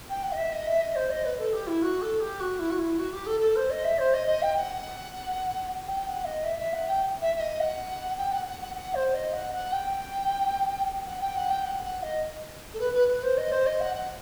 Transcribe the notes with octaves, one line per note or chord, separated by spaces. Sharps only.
G5
F#5
D#5
E5
D#5
E5
D#5
C5
D#5
B4
A4
G4
E4
F#4
A4
G4
F#4
E4
F#4
E4
F#4
G4
A4
A4
C5
D#5
E5
C5
D#5
D#5
G5
F#5
G5
F#5
D#5
E5
E5
F#5
G5
E5
E5
D#5
F#5
G5
F#5
F#5
F#5
F#5
C5
D#5
F#5
F#5
G5
F#5
G5
F#5
G5
F#5
F#5
D#5
A4
B4
B4
B4
C5
D#5
C5
D#5
F#5
F#5